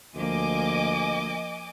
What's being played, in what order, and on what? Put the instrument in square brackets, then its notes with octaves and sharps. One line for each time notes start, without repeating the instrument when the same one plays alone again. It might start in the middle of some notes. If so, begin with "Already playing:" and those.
[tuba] D2 [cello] F3 A#3 [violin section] D#5 G#5 D6